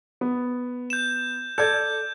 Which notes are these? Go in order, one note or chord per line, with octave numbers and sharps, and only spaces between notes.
B3
G6 E7
A4 D5 G6 G#6